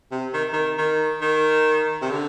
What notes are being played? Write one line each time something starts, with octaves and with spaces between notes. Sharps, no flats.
C3
D#3
D#3
D#3
D#3
C3
D3